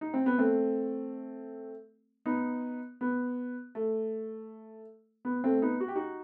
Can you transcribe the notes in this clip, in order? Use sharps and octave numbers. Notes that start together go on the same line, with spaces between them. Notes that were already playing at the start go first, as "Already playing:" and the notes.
D#4
C4
B3
A3 C4
B3 D#4
B3
A3
B3
A3 C4
B3 D#4
F#4
G4
D#4 F#4